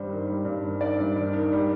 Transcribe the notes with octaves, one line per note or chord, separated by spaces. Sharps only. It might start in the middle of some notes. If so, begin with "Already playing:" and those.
Already playing: G2 G3 C5
D#3
G3
G2
D#3
D#3 D5
G2
D#3
D#3
G3